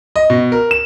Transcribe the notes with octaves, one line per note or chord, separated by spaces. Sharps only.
D#5
B2
A#4
E7